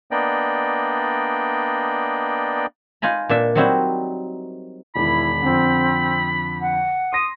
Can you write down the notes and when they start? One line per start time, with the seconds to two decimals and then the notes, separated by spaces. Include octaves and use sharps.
0.11 A#3 B3 D4 D5 D#5 G5
3.02 D#4 F4 G#5 A#5 B5
3.29 A#2 D4 E5
3.55 F#3 G3 C4 D#4 E4 F#4
4.96 E1 D#3 E4 B5
5.42 F2 D3 C4
6.62 F#5
7.13 C6 D#6 A#6